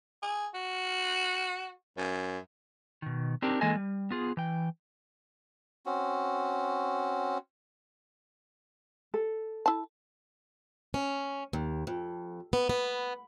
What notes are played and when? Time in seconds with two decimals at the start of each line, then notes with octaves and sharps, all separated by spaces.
0.22 G#4
0.54 F#4
1.97 F#2
3.02 B2 D#3
3.42 C4 D4 D#4 G4 A#4
3.61 E3 G#3 A#3 A4 D#5 G#5
3.76 G3
4.11 B3 F4 G#4
4.37 E3 G5
5.86 C4 C#4 F#4
9.14 A4
9.66 E4 A5
10.94 C#4
11.53 D#2
11.87 F2
12.53 B3
12.69 B3